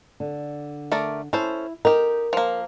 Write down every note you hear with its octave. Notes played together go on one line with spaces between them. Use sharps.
D3
A3 A#4 D5
C#4 E4 A4 C5
D#4 G4 A#4
F3 A#3